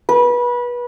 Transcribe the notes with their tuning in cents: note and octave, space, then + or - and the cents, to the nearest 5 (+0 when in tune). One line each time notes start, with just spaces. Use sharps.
B4 -25